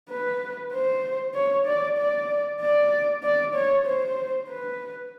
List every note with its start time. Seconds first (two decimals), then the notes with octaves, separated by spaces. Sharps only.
0.10 B4
0.73 C5
1.35 C#5
1.66 D5
1.98 D5
2.61 D5
3.23 D5
3.54 C#5
3.86 C5
4.49 B4